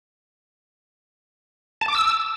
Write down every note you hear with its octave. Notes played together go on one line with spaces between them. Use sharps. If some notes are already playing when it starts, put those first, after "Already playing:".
A5
D6
E6